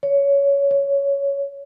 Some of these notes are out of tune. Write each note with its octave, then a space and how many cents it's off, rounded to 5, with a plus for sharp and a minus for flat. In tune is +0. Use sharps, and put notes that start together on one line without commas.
C#5 +15
C#5 +10